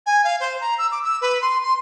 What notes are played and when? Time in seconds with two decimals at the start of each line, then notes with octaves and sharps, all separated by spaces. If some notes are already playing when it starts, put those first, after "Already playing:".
0.06 G#5
0.24 F5
0.40 C5
0.61 A#5
0.78 E6
0.91 D6
1.04 E6
1.21 B4
1.42 C6
1.63 C6